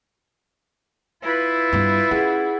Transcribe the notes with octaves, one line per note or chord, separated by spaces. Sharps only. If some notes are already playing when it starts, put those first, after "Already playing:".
E4 F4 B4
G2 B3
C#4 G#4 F#5